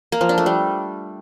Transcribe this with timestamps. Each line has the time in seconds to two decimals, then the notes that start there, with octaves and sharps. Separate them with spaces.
0.12 A#3
0.21 F3
0.29 D4
0.38 A3
0.46 G3